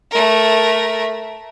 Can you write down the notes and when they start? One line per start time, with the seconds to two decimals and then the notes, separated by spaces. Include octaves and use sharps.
0.11 A3 A#4